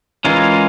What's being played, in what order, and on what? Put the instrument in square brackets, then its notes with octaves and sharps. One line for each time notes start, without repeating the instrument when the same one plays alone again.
[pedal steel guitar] E3 G#3 C#4 F4 A#4